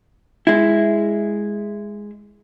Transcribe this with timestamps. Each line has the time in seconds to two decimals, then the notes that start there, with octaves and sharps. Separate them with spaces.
0.47 G#3 E4